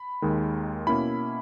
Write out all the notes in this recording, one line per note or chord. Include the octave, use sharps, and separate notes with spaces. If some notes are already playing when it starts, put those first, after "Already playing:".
Already playing: B5
D#2 D#3 G#3
B2 A#3 C#4 E4 B5